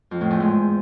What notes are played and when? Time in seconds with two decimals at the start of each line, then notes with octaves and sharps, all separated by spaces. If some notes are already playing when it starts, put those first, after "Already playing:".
0.11 F2
0.21 A2
0.31 E2
0.40 G#2